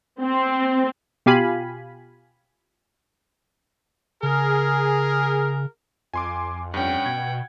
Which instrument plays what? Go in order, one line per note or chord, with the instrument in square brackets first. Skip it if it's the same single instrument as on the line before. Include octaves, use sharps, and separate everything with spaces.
[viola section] C4
[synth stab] B2 F4 G4 F5 G#5 B5
[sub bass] C#3 [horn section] G#4 A#4
[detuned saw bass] F2 [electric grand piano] G#5 C6 D6
[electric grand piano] G2 C#4 [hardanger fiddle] F#5 G5
[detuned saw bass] B2 [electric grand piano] G#6